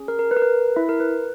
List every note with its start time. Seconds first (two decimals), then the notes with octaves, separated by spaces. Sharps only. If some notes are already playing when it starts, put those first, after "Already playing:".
Already playing: C#4 G#4
0.08 A#4
0.19 A#4
0.31 B4
0.37 A#4
0.42 B4
0.76 E4 E5
0.89 A#4
1.00 B4